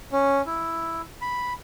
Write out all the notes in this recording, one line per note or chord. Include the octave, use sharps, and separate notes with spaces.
C#4
E4
B5